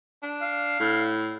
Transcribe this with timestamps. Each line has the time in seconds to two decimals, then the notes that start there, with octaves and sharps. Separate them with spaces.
0.23 D4
0.41 F5
0.80 A2